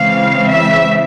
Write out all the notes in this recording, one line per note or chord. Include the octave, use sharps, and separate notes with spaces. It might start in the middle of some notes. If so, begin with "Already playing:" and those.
Already playing: C#3 E3 G#3 C4 F5
E5